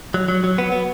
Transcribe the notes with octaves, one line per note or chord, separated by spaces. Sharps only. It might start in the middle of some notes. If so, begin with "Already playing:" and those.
F#3
F#3
F#3
B3
B3